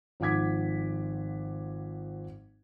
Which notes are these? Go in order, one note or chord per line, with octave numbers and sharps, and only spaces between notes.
G#1 F3 F#5 D6 G#6 B6